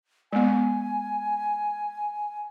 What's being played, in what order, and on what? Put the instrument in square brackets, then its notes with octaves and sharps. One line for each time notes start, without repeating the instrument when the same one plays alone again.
[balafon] G#3 B3 [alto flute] G#5